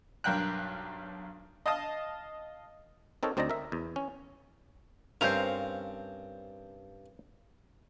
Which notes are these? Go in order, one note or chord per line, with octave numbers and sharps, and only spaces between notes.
B1 G2 A#4 F5 G5 F#6
D#5 F5 A5 D#6
C4 D#4 A4 A#4 C#5
D2 C4 D#4 D5 D#5 A#5
A#4 E5
E2
C#4
G2 C4 C#4 A#4 C5 F5 G6 F7